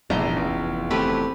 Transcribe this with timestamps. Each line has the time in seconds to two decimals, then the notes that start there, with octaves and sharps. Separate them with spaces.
0.10 F1 A#1 E2 A#5 C6
0.36 C#2
0.91 A3 C4 G4 B4